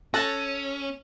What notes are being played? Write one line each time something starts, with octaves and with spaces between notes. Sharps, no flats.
C#4 A4 A5 F#6 A#6